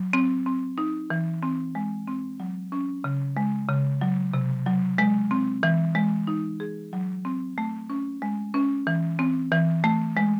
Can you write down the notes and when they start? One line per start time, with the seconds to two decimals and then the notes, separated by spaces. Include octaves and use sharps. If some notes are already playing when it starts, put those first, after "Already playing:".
Already playing: F#3
0.13 C4
0.46 C4
0.78 D#4
1.10 E3
1.43 C4
1.75 G#3
2.08 C4
2.40 F#3
2.72 C#4
3.04 C#3
3.37 G#3
3.69 C#3
4.01 F#3
4.34 C3
4.66 F#3
4.98 G#3
5.31 C4
5.63 E3
5.95 G#3
6.27 D#4
6.60 G#4
6.93 F#3
7.25 C4
7.58 A3
7.90 C#4
8.22 G#3
8.54 C#4
8.87 E3
9.19 C4
9.52 E3
9.84 A3
10.17 G#3